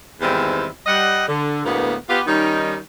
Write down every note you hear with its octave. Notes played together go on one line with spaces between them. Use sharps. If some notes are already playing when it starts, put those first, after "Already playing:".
E2 G#2 D#3 G3 C4 E4
G3 D#5 F#5
D3
D2 A2 G#3 A#3 B3
B3 F4 G4
D#3 G3 C#4 D#4